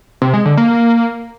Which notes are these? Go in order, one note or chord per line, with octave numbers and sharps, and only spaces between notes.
C3
G#3
D3
A#3